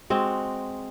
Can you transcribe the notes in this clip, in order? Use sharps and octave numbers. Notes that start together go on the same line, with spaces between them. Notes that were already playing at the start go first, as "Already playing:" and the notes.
G#3 C4 F#4